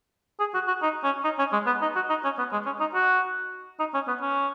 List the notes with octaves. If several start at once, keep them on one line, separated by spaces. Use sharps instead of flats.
G#4
F#4
F#4
D#4
C#4
D#4
C#4
G#3
B3
D#4
F#4
D#4
C#4
B3
G#3
C#4
D#4
F#4
D#4
C#4
B3
C#4